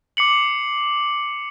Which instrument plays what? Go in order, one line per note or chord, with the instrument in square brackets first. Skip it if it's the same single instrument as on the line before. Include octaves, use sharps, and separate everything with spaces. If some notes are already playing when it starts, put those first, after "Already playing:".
[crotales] D6 C7 C#7 F#7